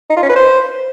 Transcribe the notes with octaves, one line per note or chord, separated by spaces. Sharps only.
D#4
F4
C#4
B4
C5